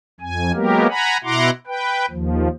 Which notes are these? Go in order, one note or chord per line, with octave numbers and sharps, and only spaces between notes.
F2 G#5
F#3 G#3 A#3 B3 G4 A#4
F#5 G#5 A#5 B5
B2 E4 F#5 A#5 C6 D6
B4 G5
D#2 F3